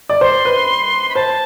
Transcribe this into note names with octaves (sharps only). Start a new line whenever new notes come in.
D5
C5 C6
B4
B5
C5 A5